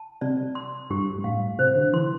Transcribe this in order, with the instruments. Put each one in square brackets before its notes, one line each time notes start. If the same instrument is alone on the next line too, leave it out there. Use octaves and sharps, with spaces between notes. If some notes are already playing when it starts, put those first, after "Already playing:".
Already playing: [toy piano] A5
[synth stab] C3 [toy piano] D5
[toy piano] C6
[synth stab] G2 [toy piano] G4
[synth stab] G2
[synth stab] A2 [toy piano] F5
[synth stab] C3 [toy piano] C5
[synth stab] D3
[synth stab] E3 [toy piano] C6